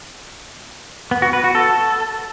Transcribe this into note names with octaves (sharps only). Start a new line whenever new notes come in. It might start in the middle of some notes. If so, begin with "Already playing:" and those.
B3
F#4
B4
F#4
A4